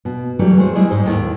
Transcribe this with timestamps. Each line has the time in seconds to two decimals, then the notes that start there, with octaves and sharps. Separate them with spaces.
0.05 B2
0.39 E3 F#3 G3 A3
0.58 G#3 A3 C5
0.75 G3 G#3 E4 D#5
0.90 G#2 E4 C5
1.05 D#2 A2